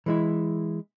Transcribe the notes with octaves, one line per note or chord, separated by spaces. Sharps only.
E3 G#3 E4